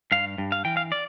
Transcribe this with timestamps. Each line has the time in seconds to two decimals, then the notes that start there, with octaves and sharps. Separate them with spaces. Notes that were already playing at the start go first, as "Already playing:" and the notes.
0.12 G2 F5
0.38 G2
0.52 F5
0.65 E3 G5
0.77 F5
0.92 D5